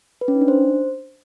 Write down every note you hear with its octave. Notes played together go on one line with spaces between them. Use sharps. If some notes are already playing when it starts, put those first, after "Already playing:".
B4
C#4
D#4
D4
C5